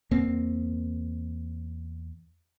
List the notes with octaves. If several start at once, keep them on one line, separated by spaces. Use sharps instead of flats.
E2 A#3 C4